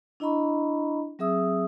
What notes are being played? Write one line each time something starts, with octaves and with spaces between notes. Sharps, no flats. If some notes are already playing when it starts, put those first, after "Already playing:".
D4 E4 D#5 A#5 B5 C#6
F#3 C4 G#4 E5 D#6 E6